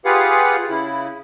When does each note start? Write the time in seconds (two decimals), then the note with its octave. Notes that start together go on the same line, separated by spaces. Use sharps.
0.05 F4 G4 G#4 B4 F5 F#5
0.69 C#3 E4